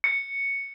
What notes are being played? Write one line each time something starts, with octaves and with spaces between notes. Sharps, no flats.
C#7